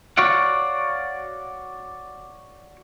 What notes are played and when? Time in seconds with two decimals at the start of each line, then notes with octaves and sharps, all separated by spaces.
0.17 F#4 C#5 D5 F5 F#5